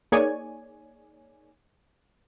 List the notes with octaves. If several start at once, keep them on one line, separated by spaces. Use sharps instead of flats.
A#3 D#4 G#4 C#5 D5 G#5